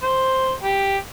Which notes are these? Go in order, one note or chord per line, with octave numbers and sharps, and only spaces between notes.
C5
G4